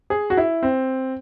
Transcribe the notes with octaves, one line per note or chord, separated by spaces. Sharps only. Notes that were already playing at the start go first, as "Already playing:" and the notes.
G#4
F#4
E4
C4